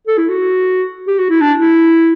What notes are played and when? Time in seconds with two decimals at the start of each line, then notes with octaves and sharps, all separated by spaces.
0.07 A4
0.18 E4
0.29 F#4
1.08 G4
1.19 F#4
1.30 E4
1.41 D4
1.59 E4